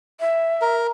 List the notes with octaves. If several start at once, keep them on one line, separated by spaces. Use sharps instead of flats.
E5
A#4